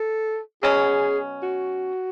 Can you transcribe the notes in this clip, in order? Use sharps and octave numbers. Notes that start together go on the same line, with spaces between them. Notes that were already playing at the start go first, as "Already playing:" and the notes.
Already playing: A4
B2 F#3 C#4 G#4
F#4